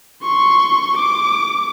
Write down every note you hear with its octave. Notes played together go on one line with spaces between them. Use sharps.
C6 C#6
D6